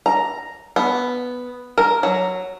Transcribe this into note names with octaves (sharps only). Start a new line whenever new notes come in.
A#5
B3
A#4
F#3